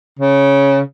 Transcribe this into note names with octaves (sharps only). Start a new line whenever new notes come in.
C#3